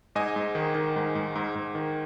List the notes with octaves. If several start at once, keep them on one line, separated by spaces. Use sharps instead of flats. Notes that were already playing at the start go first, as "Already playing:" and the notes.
G#2 D#5 G#5
G#2
D#3
D#3
G#2
G#2
G#2
G#2
D#3